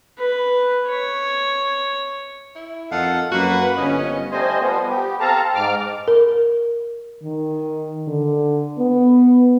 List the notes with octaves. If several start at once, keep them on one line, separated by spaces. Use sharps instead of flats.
B4
C#5
E4
F2 D#3 A4 F5 F#5
F#2 A#3 F#4 B4 F#5
G1 F3 C#4 D#5
G3 A3 C5 D#5 G#5
F3 G3 B3
B3 G4
C4 A4 F5 A5 A#5
G#2 D6 F6
A#4
D#3
D3
B3